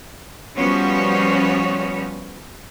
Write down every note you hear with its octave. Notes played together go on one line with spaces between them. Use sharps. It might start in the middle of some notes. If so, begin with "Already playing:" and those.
F3 G3 B3 C#4 F#4 C#5